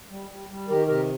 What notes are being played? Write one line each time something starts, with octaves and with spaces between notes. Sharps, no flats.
G3
G3
G3
D#3 G4 A#4
C3 G4 A#4